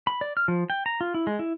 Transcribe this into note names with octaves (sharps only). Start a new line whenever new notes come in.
B5
D5
F6
F3
G5
A#5
F4
E4
G#3
E4